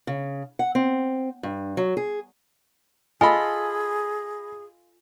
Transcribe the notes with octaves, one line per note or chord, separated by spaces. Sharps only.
C#3
F#5
C4
G2
F#3
G#4
F4 G#4 A4 D#5 G#5 B5